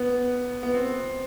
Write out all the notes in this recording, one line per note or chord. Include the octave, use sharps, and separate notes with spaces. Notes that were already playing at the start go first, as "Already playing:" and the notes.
Already playing: B3
B3
C4